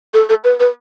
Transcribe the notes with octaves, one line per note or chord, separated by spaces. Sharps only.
A4
A4
B4
B4